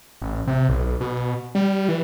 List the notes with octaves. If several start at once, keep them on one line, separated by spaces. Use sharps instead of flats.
A1
C3
B1
B2
G3
E3